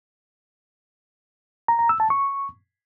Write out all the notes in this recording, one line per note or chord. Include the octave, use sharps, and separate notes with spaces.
A#5
A#5
E6
A5
C#6